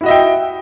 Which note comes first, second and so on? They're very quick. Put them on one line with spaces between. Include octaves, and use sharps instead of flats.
E4 F#4 D#5 E5 G5